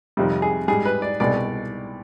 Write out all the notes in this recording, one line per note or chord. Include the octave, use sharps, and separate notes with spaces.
F2 C3 D#3 G3
G#4
G#2 G3 G#4
B4
D5
C2 B2 G#3 D5